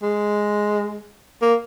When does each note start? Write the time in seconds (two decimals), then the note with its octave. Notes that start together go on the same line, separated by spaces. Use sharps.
0.03 G#3
1.42 A#3